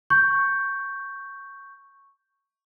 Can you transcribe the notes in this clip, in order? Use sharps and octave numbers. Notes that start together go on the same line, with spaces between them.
C#6 G6